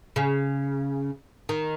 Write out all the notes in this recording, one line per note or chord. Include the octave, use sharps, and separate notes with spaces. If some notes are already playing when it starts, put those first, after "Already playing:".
C#3
D#3